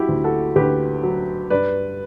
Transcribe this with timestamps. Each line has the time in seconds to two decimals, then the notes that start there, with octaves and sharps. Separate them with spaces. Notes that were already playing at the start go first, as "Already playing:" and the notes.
Already playing: F#3 E4 F#4 G4
0.09 D2
0.24 F#4 A4
0.56 D2 G4 B4
1.03 F#3
1.50 G2 B4 D5